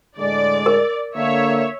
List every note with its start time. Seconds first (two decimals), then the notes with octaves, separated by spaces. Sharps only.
0.18 A2 D3 G#3 D5
0.66 A#4
1.15 D3 A#3 C#5 E5